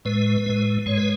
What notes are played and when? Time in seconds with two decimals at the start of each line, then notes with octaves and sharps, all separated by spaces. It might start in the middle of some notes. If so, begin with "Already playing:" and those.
0.05 A2 G#3 B4
0.46 A2 G#3
0.86 G#2 G#3 C#5
0.97 B4